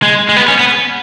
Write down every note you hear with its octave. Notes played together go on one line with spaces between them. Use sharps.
G#3
G#3
B3
C#4
B3